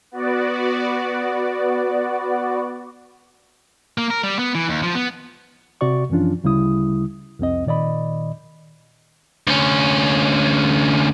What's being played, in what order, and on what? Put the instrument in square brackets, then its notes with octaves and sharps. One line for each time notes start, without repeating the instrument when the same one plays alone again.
[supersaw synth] B3 F#4 D5
[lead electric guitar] A#3
A#4
G3
B3
E3
D#2
F3
B3
[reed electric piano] C3 F#4 D5 C#6
F#2 E3 F3 C#4 D4 F4
D2 C#3 G3 E4 D#6
C2 F2 C4 D#5
A#2 D#3 D5 D#5 B5
[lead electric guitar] D2 C#4